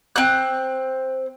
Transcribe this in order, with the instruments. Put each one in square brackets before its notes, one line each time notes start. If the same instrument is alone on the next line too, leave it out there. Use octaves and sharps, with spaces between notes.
[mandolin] C4 F#6